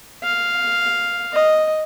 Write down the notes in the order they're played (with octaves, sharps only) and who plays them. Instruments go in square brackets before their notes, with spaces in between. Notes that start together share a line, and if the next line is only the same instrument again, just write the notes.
[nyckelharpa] F5
D#5